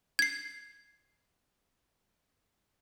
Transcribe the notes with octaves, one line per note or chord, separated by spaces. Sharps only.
G#6 C7